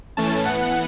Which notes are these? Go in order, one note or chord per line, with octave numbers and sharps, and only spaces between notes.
A2 E3 A3 C#4 A5
E3 B3 F#5